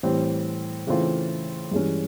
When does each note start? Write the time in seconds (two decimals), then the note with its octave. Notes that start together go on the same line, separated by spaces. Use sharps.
0.03 A2 E3 G3 C4
0.87 C#3 E3 A3 C4 F4
1.71 G2 E3 G#3 C#4